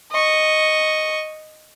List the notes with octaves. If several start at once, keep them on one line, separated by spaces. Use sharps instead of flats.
D#5 C#6